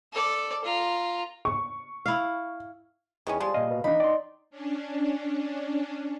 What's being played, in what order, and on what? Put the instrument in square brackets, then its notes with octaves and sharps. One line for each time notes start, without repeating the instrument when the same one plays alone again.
[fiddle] A4 D5
F4 A#5
[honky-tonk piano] C#6
[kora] E4 F5
[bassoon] E2 [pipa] D#3 B3 C#4
[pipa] F3 G#3 C6 [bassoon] G3
[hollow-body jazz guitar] A#2 D#5 [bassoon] G3 [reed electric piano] F5
[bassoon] B2
[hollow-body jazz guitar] D#3 E3 D4 [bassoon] D#4 [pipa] B5
[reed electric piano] D5 [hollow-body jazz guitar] G5 C6
[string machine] C#4 D4